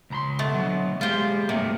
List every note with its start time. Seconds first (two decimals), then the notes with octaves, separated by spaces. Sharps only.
0.10 C#2 A#5 C6
0.39 B2 A3
0.54 D3 F#3
1.01 G#3 F4 G4 C5
1.49 G2 C3 A3 A#3